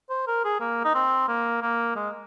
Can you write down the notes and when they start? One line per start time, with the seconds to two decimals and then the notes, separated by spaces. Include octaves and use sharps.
0.10 C5
0.27 A#4
0.44 G#4
0.61 A#3
0.84 D#4
0.95 C4
1.28 A#3
1.62 A#3
1.96 G#3